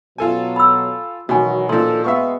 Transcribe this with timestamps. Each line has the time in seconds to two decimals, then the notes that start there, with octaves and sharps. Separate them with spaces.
0.18 B2 F#3 F4 A4 G#5
0.56 B5 E6
1.29 B2 D#3 E3 F#3 F#4 G#5
1.69 A#2 D#3 F3 D4 A4 C6
2.04 G#3 B3 E5 F5 C#6